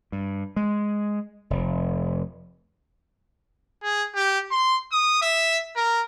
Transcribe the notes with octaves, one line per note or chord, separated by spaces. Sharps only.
G2
G#3
F1
G#4
G4
C6
D#6
E5
A#4